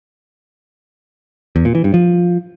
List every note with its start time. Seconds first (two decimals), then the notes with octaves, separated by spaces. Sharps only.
1.56 E2
1.65 A#2
1.75 E3
1.84 G2
1.94 F3